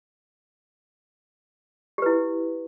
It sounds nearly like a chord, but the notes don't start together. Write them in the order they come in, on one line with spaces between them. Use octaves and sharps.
G4 B4 E4